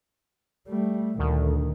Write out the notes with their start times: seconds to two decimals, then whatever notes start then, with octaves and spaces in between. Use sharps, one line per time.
0.68 G3 A3
1.19 D2 A#2 D#3